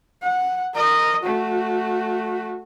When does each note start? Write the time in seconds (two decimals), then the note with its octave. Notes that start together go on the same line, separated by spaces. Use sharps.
0.22 F#5
0.74 A#4 D#5
1.23 A3 F#4